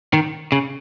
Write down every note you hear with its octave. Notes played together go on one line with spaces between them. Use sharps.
D#3
C#3